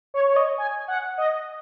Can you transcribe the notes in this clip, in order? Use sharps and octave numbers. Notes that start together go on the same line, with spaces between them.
C#5
C#5
D#5
G#5
F#5
D#5